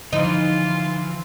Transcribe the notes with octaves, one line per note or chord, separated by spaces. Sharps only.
D3 E3 F3 D#4 F4